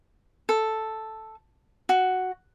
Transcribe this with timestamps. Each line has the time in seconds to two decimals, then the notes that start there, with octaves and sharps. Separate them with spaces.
0.49 A4
1.89 F#4